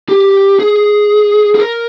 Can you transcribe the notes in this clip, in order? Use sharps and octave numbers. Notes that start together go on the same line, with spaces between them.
G4
G#4
G#4
A#4